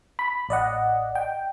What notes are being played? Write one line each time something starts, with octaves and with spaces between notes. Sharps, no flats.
B5
A1 D5 D#5 F#5
G5